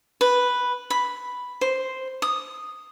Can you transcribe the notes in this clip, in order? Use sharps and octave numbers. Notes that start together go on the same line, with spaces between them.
B4
B5
C5
D#6